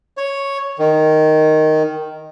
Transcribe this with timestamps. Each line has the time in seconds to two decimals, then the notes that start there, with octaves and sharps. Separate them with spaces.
0.17 C#5
0.79 D#3